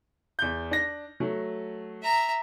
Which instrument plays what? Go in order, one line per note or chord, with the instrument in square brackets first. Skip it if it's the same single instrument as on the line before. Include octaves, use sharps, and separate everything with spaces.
[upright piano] E2 G6
D4 A#6
F#3 A3
[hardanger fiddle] E5 A#5